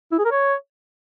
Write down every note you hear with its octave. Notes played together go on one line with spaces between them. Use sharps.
E4
G#4
A#4
C#5